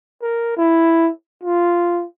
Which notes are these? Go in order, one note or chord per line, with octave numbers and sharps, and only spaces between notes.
A#4
E4
F4